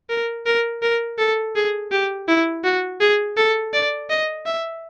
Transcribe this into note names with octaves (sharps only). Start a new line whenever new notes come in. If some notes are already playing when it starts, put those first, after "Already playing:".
A#4
A#4
A#4
A4
G#4
G4
E4
F#4
G#4
A4
D5
D#5
E5